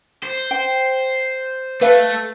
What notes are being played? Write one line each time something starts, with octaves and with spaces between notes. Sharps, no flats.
C5
G5
A3 B4 F5